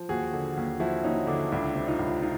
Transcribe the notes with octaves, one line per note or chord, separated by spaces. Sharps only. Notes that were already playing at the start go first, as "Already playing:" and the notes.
Already playing: F3
D#2 F#4 G#4
D3
D#2
F3 E4 F#4
D#2 C#4 D#4
D3 D4 E4
C#2 D4 E4
C3
D#4 F4
C#2
D#4 F4